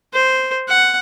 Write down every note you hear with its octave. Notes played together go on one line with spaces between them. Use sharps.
C5
F#5